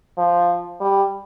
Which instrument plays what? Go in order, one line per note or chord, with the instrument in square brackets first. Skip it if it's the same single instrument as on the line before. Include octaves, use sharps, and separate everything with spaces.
[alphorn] F3
G3